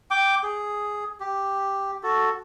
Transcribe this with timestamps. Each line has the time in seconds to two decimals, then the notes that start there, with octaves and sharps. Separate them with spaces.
0.11 G5 D6
0.43 G#4
1.20 G4
2.03 F#4 A4